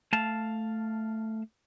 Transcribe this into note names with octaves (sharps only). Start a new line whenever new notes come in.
A3 F5 A5